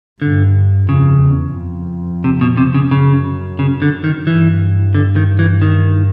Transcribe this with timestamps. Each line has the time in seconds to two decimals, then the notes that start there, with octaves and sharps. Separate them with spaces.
0.22 G2 D3
0.89 F2 C#3
1.23 E2
1.57 F2
2.24 C3
2.41 B2
2.57 C3
2.74 C#3
2.91 F#2 C#3
3.59 C#3
3.82 D3
4.04 D#3
4.26 G2 E3
4.95 D3
5.16 D#3
5.39 E3
5.62 D#3